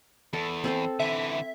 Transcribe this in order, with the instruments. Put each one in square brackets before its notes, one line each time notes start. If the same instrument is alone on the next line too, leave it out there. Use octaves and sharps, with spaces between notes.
[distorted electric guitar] E2 [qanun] A4
[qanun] C4 A4 C5
[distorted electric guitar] D3 E3 [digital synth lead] E5